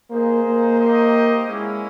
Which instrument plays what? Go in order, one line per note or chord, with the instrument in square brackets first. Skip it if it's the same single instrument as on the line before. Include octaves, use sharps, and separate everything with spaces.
[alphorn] A#3 [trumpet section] D#4 G#4 C5
[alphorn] A#3
[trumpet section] D#4 G4 C5 D#5
[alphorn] G#3 [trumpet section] A#3 C#4 E4